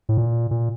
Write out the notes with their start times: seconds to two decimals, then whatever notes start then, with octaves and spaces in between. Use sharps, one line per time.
0.09 A2
0.17 A#2
0.51 A#2